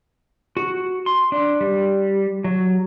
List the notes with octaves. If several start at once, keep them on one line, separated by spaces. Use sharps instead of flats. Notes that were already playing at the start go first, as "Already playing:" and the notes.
F#4
C6
D4
G3
F#3